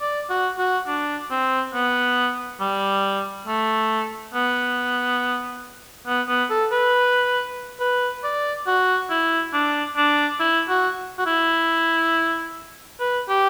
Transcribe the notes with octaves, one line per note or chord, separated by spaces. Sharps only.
D5
F#4
F#4
D4
C4
B3
G3
A3
B3
B3
B3
A4
B4
B4
D5
F#4
E4
D4
D4
E4
F#4
F#4
E4
B4
G4